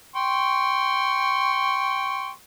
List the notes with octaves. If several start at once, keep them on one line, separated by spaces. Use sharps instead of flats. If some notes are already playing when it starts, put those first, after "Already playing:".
G5 C6 C#6